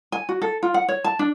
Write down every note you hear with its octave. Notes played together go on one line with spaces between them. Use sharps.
G#5
F#4
A4
F4
F#5
C#5
A5
D4